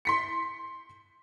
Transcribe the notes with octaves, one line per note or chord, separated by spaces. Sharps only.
C6 B6 C#7